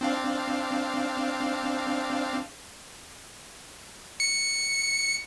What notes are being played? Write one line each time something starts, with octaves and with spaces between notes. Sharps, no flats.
C4 D4 F5
C#7